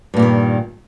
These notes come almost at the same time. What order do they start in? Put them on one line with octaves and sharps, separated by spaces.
G2 A#2 G3 D#3